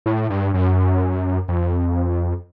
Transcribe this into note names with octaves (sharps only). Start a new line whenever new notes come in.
A2
G2
F#2
F2